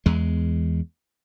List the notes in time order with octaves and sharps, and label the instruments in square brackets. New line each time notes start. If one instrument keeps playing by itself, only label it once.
[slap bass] E2 G#3